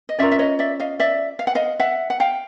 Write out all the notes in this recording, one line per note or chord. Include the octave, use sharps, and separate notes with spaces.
D#5
C#4 F4 A#4 D5 E5
E5
C#5 D#5
D5 E5
D#5 F5
D5 E5
F5
F#5
D#5 F5
E5 F#5
F#5
F5 G5